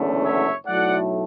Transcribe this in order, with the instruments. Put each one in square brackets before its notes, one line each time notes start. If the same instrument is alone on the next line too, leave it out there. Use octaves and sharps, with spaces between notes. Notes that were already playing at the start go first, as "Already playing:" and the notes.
Already playing: [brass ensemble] F#1 E2 D3 A3 C#4
C#5 E5
B1 A2 F#3 A3 E4 D5 F#5